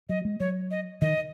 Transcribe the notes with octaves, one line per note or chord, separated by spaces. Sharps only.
F#3 D#5
G#3
F#3 C#5
D#5
D#3 D#5